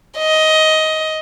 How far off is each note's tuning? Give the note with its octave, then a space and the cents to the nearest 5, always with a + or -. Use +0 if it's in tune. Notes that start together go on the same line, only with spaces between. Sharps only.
D#5 +15